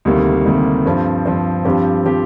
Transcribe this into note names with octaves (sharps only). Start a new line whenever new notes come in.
D2 C3 D#3 G3 A#3
D2 C3 D#3 G3 A#3
G2 F3 C4
G2 F3 C4
G2 F3 C4 G4
F3 C4 G4